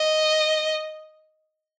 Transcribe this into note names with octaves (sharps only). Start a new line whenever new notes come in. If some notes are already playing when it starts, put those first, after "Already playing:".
Already playing: D#5